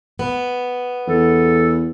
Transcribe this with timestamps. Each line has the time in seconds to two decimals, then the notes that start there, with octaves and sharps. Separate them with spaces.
0.19 B3
1.07 E2 A4